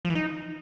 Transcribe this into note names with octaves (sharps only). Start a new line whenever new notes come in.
F3
E3
D#4